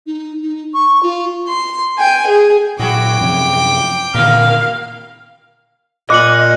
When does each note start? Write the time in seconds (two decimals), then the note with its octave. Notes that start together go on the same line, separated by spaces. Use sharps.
0.07 D#4
0.43 D#4
0.73 C#6
1.03 F4
1.47 C6
1.98 G5 G#5
2.27 G#4
2.79 A#2 F#3 E4 F#4 G#4 G5 D6
3.21 F#2 C3 F3
4.14 A#2 D3 D#3 A#3 B3 A#4 F5
6.10 A#2 D#5 D6 F#6 C#7 F#7